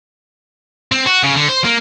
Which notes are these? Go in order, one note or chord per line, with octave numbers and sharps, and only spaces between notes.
C4
F#4
C#3
D3
C5
A#3